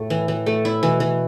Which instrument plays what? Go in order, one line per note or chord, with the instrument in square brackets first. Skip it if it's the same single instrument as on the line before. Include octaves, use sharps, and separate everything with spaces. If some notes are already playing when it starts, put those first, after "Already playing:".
Already playing: [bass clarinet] A2 [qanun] A3
[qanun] E3
E3
A3
E4
[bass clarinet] B2 [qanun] E3
[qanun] E3